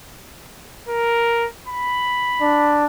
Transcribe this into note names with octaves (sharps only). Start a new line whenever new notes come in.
A#4
B5
D4